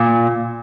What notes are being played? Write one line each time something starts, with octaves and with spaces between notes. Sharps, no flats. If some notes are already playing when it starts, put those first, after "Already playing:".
Already playing: A#2